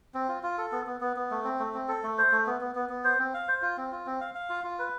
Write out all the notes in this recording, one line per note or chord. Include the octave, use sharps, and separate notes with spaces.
C4
F4
F4
A4
B3
B3
B3
B3
A3
C4
A3
C4
A4
A3
C5
A3
B3
B3
B3
B3
C5
C4
F5
C5
F4
C4
F4
C4
F5
F5
F4
F4
B4